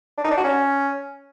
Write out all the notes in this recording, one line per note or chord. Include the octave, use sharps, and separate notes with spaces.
D4
D#4
D4
F#4
C#4